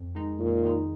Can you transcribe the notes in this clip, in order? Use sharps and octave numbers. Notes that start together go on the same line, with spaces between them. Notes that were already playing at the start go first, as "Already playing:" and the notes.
Already playing: F2
D#3 G#3 D#4
F2 A#2
D#3 G#3 D#4